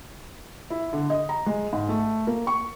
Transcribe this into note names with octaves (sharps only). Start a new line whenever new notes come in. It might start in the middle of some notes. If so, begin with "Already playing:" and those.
E4
D3
D#5
A#5
G#3
G#2
A3
A#3
C#6